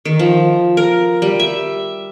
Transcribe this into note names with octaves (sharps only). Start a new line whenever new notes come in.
D#3
F3
A#4
G3
E5